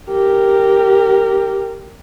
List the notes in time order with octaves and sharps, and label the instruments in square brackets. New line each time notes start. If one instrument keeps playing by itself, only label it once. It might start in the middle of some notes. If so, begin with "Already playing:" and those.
[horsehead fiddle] G4 A#4